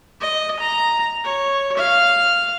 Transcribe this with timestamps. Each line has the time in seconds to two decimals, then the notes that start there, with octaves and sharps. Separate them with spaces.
0.21 D#5
0.60 A#5
1.24 C#5
1.78 F5